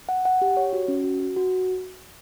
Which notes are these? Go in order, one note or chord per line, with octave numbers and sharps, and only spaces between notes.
F#5
F#5
G4
C#5
F#4
C#4
F#4
F#4
F#4